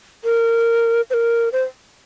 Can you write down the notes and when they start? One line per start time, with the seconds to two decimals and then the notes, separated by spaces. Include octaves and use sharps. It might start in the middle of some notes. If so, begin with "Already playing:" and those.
0.24 A#4
1.10 C5
1.14 A#4
1.53 C5